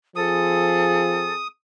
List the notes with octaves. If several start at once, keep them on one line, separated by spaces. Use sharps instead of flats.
F3 C4 G#4 A4 D#6